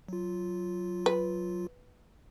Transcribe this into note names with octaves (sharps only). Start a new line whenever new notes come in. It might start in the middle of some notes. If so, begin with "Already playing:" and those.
F#3 F4
B4